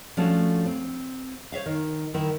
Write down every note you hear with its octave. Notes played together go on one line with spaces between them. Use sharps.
F3 A3 C#4 D4 F#4 A4
C4
C5 C#5 E5 F5
D#3
D#3 E4